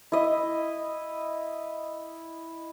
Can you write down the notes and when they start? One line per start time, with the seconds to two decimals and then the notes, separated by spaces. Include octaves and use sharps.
0.12 E4 D#5